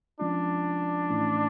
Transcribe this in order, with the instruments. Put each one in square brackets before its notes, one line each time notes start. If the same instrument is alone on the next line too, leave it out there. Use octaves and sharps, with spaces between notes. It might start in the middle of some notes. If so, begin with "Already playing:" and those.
[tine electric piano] F3 G#3 C#4 F4 [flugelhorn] D4
[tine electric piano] A2 E3 A3 C#4 E4